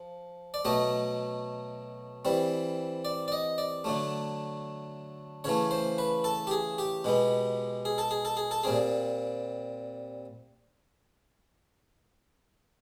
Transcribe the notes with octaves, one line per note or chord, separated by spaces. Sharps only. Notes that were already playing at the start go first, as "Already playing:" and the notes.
Already playing: F3
D5
B2 F#3 A3 D#5
E3 G3 C4
D5
D5
D#5
D5
D3 F#3 A3
C#3 E3 A3 C#5
C5
B4
A4
G4
G#4
G4
B2 G#3 B3
G#4
A4
G#4
A4
G#4
A4
A#2 G3 C4 G#4